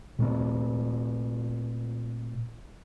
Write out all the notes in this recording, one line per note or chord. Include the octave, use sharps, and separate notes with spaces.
A#2 A3 C4